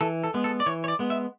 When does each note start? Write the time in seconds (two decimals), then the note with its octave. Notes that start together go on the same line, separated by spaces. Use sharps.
0.01 E3 A4
0.24 A4
0.34 G#3 B3
0.44 A4
0.60 D5
0.66 E3 C#5
0.84 C#5
0.88 D5
0.99 G#3 B3
1.10 E5